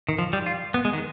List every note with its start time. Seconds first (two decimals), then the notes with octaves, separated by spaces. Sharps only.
0.09 D#3
0.19 F3
0.33 G3
0.46 F4
0.74 B3
0.85 G#3
0.93 D#3